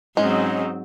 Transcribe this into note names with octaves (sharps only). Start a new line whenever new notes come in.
G#2 F#3 G#3 C4 C#4 D#4